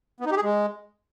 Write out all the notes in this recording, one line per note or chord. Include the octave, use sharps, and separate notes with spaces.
B3
D#4
G4
G#4
G#3